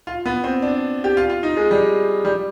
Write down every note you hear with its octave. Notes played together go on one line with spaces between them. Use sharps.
F4
B3
C4
D4
G4
F4
F4
D#4
G#3
G3
G3